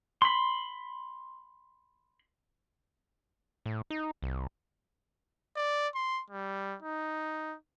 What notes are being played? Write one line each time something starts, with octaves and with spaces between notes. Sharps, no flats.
B5 C6
A2
D#4
C2
D5
C6
G3
D#4